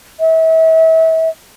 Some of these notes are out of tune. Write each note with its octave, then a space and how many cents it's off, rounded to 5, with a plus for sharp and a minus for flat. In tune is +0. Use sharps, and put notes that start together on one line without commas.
E5 -35